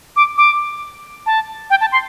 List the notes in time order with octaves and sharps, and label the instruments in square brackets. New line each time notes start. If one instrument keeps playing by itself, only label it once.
[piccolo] D6
D6
A5
G5
A5
C6